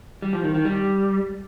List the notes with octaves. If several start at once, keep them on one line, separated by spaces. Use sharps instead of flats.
G3
F3
D#3
D#3
G3